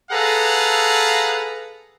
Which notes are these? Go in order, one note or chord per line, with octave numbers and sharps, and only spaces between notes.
G#4 A4 B4 F5 F#5 A#5